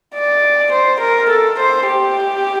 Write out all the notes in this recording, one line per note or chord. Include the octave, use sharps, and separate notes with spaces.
D5
C5
A#4
A4
C5
G4